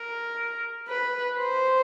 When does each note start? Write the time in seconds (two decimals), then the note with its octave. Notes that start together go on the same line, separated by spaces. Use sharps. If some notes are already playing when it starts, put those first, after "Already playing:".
Already playing: A#4
0.88 B4
1.38 C5